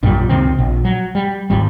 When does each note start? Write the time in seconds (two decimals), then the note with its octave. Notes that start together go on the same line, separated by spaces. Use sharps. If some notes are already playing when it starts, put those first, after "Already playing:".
0.03 A#1 F#2 A#2 G3
0.29 C#2 C3 D#3 C4
0.59 A#1
0.85 F#3
1.15 G3
1.50 D1 G#1 D#2 G3